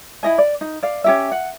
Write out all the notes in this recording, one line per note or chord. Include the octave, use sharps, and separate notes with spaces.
E4 D#5 G#5
D5
D#4
D5 F5
C#4 G4 E5
F#5